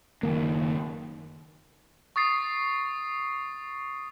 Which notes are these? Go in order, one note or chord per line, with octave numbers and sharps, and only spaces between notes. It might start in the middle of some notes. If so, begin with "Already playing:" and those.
F#1 D#3 A#3
C#6 D#6 A6 C7